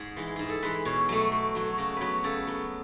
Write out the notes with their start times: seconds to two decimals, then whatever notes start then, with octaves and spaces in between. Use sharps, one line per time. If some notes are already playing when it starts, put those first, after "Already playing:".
Already playing: G#2 G#4
0.17 E3 G#3
0.36 G#2 G#4
0.49 A4
0.62 E3 G#3 B4
0.85 B2 C#5
1.09 F#3 A3
1.32 B2
1.55 F#3 A3
1.67 C#5
1.78 C#3 D#5
1.97 F#3 B3 B4 C#5
2.24 C#3 A4
2.47 F#3 B3